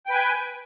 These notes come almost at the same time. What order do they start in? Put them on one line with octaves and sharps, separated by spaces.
G5 B4 G#5